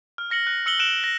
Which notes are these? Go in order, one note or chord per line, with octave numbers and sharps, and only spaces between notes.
F6
F6 A#6 C#7 F#7
F#6
E6 C#7 F#7 G7
F#6 D7 E7
A#6